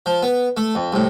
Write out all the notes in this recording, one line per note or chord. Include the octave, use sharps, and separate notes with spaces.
F3
B3
A3
F2
C2 A2